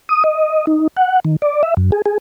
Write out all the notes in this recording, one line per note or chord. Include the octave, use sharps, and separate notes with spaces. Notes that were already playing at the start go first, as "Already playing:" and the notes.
D#6
D#5
D#4
F#5
D#3
D5
E5
F#2
G#4
G#4